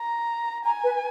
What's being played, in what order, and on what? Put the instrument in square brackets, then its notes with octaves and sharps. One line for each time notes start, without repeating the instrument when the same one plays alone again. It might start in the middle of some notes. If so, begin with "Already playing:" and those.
Already playing: [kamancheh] A#5
[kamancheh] G#5 [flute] A#5
[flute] B4